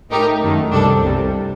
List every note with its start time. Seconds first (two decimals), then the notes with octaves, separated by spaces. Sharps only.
0.11 A2 A3 D#4 G4 A#4
0.41 F#2 D#3 A3
0.72 C2 C3 G3 D4 A4
1.02 C2 C3 G3